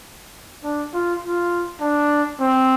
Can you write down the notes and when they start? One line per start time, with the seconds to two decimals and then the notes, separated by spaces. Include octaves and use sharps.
0.63 D4
0.93 F4
1.23 F4
1.81 D4
2.40 C4